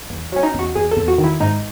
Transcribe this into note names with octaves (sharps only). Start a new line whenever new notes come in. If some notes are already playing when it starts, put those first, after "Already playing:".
E2
F#3 C#4
D#4
E2 F#4
E2 G#4
A4
E2
F#4
D#3
E4
G#2 D#4